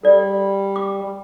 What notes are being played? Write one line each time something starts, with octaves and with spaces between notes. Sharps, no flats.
G3 A4 D5
D6